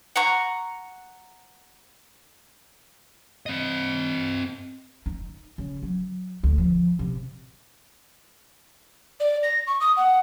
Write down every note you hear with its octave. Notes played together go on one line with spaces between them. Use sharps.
F#5 A#5 C#6
C4 D#5
D#4
C#3
F#3
D2
F3
C3
D5
A#6
C#6
D#6
F#5